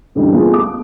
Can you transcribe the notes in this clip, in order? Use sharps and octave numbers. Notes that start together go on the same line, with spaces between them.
F#2 D3 E3 G3 A3 D#4
B3 F4 G#4 A4
D6